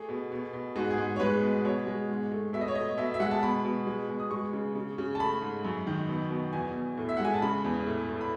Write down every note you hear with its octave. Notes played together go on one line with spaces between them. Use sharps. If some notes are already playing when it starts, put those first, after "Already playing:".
Already playing: A3 G#4
B2
B2
B2
G#2 F#4
G#4
G#2
C#5
G#3 B4
B2
B2 C#5
G#3
G#2
A3
B2 E5
D#5
C#5
A3 D#5
B2 E5
E5
G#3 F#5
A5
B2 B5
B2
G#3
B2
D#6
G#3 C#6
C#3
C#3
C#3
A5
A3 B5
G#2
F#2
D#3
B2
B2
E2 G#5
E2
A2
E5
G#3 F#5
G#5
A5
C#3 B5
E2
A2
A2
B5